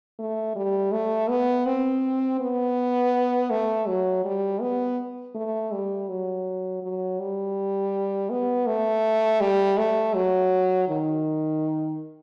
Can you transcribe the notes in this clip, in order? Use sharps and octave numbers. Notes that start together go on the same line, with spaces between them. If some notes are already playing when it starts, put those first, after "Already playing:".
A3
G3
A3
B3
C4
B3
A3
F#3
G3
B3
A3
G3
F#3
F#3
G3
B3
A3
G3
A3
F#3
D#3